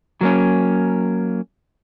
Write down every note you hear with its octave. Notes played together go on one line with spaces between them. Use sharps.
F#3 A#3 C#4